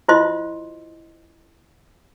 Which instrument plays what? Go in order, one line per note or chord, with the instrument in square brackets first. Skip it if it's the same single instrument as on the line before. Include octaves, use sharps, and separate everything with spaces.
[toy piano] E4 F4 C5 D#5 C6